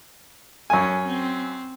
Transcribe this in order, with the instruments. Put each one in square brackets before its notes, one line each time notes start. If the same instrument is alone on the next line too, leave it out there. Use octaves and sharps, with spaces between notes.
[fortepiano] F#2 G#5 [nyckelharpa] C#4
[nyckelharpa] C4